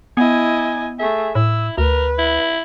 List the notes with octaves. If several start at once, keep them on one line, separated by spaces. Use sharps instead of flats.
B3 E4 D#5 G#5
A3 G#4 E5
A2 E4 E6
D2 A#4 B4
E4